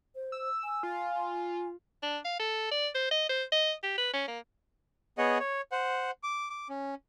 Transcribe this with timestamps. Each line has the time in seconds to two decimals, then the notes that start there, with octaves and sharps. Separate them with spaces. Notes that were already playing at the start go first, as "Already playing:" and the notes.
0.15 C5
0.32 E6
0.63 G#5
0.83 F4
2.03 D4
2.25 F5
2.40 A4
2.72 D5
2.95 C5
3.12 D#5
3.30 C5
3.52 D#5
3.83 G4
3.98 B4
4.13 C#4
4.28 A#3
5.18 B3 G#4 C#5 D#5 F#5
5.40 C#5
5.72 C5 F#5
6.23 D6
6.50 D6
6.69 C#4